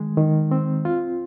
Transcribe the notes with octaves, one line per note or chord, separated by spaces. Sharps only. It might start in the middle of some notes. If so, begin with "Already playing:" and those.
Already playing: D#3 G#3
D#3
C4
F4